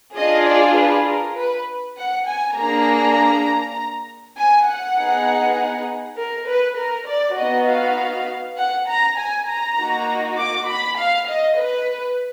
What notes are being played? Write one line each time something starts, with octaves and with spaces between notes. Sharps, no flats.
D4 F4 G#4 D#5
D5
B4
A#4
B4
F#5
G#5
A#3 D4 G#4 A#5
G#5
F#5
B3 D#4 G#4
A#4
B4
A#4
D5
B3 D#4 F#4 D#5
F5
F#5
A#5
G#5
A#5
A#3 D#4 F#4
D6
B5
F5
D#5
B4